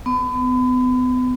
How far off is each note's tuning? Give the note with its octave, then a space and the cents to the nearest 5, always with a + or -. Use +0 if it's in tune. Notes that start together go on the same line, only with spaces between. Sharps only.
B3 +35